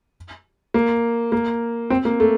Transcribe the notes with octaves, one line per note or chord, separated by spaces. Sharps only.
A#3
A#3
C4
A#3
A3